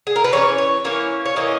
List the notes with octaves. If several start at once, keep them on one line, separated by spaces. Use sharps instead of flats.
G#4
A#4
B4
E3 A#3 C#4 C#5
C#5
E3 A#3 C#4 C#5
C#5
E3 A#3 C#4 D#5